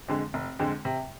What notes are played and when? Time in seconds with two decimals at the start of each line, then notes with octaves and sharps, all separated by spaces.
0.08 F2 D3 G#3
0.34 F1
0.59 F2 D3 G#3
0.85 C3